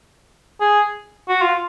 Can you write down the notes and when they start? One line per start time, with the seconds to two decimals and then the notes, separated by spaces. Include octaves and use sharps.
0.61 G#4
1.28 F#4
1.42 F4